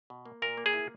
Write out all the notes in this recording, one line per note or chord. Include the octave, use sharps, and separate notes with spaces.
B2
A#3
A#2 A#4
A#3
G#4
E4